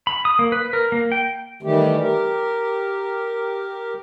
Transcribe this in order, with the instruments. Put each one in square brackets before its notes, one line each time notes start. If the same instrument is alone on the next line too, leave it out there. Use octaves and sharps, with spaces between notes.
[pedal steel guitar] B5
D#6
A#3
B4
A#4
A#3
G5
[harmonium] D#3 E3 G3 A3 G4
G4 A#4